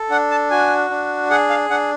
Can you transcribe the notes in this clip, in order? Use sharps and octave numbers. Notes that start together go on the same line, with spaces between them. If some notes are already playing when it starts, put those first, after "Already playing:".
Already playing: A4
D4 F#5
A5
F#4 G#5
D4
G#4 F#5
F5
D4 F#5